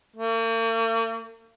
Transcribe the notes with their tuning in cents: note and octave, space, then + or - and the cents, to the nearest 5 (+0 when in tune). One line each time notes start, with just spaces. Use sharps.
A#3 -45